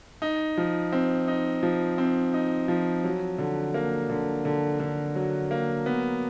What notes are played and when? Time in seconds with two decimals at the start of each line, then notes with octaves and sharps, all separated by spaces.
0.22 D#4
0.57 F3
0.92 C4
1.28 D#4
1.63 F3
1.98 C4
2.34 D#4
2.68 F3
3.04 F#3
3.38 D3
3.74 A#3
4.10 D3
4.45 D3
4.80 D3
5.15 F#3
5.51 A#3
5.86 B3